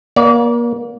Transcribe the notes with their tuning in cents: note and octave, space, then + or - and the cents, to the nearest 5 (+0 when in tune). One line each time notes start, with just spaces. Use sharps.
A#3 +35 D5 -35